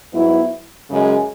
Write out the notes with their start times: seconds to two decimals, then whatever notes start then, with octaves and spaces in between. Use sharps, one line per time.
0.13 G#2 F#3 B3 E4
0.90 F#2 C#3 G#3